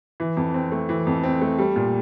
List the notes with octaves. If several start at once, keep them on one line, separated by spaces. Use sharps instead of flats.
E3
F2
C4
A3
E3
F2
C4
A3
G3
A#2